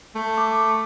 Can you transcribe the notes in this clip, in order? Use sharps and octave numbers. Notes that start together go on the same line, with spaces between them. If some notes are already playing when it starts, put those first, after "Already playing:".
A3
D6